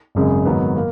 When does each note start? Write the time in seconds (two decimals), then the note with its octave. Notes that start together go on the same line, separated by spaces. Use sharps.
0.15 G#1 F#2 C#3 G#3
0.45 G#2 D#3 F#3 B3
0.76 A#3